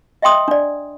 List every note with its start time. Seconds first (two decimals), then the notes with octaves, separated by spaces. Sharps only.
0.22 D#5 E5 G5 C6 D#6
0.48 D4 D5